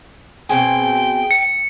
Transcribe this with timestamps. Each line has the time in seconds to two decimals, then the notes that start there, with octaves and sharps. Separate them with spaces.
0.49 B2 C4 G#4 G5
1.31 C#7